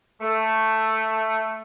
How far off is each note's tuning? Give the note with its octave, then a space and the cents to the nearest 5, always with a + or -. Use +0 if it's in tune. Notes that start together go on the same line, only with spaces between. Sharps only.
A3 +5